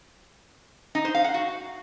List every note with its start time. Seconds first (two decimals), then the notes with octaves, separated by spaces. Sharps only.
0.95 D#4
1.05 C5
1.15 F5
1.24 F#5
1.34 F#4